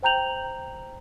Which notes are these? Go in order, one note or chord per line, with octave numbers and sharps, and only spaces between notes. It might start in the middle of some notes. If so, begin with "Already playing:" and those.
C5 G5 A#5 G6 F7 F#7